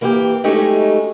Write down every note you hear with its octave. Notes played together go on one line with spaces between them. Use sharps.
E3 A#3 E4 F#4 G4
F#3 G#3 A3 C#4 D#4 G4